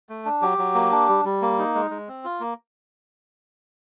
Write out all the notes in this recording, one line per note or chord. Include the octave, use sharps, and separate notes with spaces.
A3
D4
F#3 G4
F#3
A#3
D4
G3
G3
A#3
D#4
G#3
G#3
C4
F4
A#3